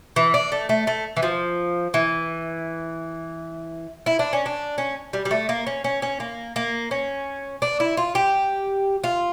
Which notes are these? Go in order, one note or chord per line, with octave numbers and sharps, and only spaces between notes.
E3
D4
A3
A3
A3
E3
F3
E3
E4
D4
C#4
D4
C#4
G3
G3
A3
A#3
C#4
C#4
C#4
A#3
A#3
C#4
D4
E4
F4
G4
F4